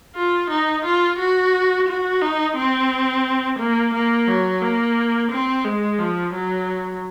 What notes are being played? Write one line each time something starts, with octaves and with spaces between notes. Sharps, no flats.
F4
D#4
F4
F#4
F#4
D#4
C4
A#3
A#3
F#3
A#3
C4
G#3
F3
F#3